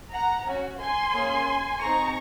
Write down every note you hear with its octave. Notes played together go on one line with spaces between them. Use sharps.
F#5 A#5
C#4 F#4
G#5 C6
A#3 C#4 G#4
C4 D#4 G#4 A#5 C#6